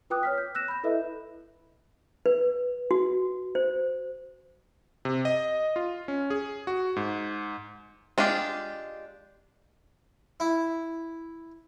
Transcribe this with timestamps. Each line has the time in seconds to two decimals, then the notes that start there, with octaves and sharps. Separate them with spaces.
0.10 F4 B4 G5 D6 D#6 F#6
0.23 C#5 F6 B6
0.38 G6
0.55 E6 F#6 A#6 E7
0.68 B5 G6
0.84 E4 A4 B4 D#5 E5
2.26 B4
2.91 F#4
3.55 C5
5.05 C3
5.25 D#5
5.76 F4
6.08 C#4
6.30 G#4
6.67 F#4
6.96 G#2
8.18 G#3 D4 F4 G4
10.40 E4